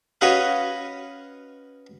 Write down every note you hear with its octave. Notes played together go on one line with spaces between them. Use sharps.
C#4 F#4 B4 C#5 D#5 F5